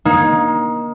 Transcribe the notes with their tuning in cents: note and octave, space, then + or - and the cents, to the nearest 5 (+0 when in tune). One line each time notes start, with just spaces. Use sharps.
A#3 +25 D#4 +0